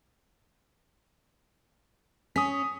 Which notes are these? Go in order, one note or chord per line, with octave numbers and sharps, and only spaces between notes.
C#4 D#6 B6